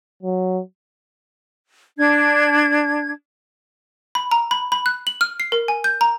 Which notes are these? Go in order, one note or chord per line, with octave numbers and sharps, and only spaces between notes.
F#3
D4 G#6
B5
A#5
B5
B5
F#6
F#7
F6
C7
A#4
G#5
G6
A#5